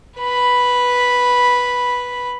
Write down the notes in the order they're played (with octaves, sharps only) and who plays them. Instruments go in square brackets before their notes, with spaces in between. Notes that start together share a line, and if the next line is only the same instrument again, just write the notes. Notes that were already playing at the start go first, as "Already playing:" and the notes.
[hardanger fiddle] B4 B5